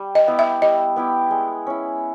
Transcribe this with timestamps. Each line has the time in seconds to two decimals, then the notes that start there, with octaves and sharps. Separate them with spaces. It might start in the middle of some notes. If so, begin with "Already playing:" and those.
Already playing: G3
0.15 D#5
0.27 B3 E4 G4
0.39 E5
0.62 G3 D#5
0.96 B3 E4 G4
1.31 G#3
1.67 C#4 E4